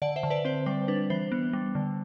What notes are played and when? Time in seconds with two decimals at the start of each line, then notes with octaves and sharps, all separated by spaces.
0.02 D3 D5 F#5
0.16 C5 E5
0.23 D3
0.30 B4 D5
0.45 C4 C5
0.66 G3 C5
0.88 D4 B4
1.10 E3 C5
1.32 B3
1.53 G3
1.75 D3